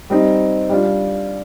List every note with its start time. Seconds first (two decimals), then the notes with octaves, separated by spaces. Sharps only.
0.10 G3 C4 D#4
0.69 G3 D4 F4